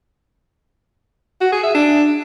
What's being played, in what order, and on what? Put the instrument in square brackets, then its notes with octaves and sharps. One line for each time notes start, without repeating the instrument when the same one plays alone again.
[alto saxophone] F#4
G#4
E5
D4